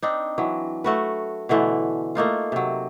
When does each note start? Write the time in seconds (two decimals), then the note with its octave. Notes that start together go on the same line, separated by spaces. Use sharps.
0.03 C4 D4 D#4
0.38 E3 F#3
0.84 A3 F#4 B4
1.49 B2 D3 E3 A3
2.15 A3 A#3 D#4 F4
2.52 C3 F#3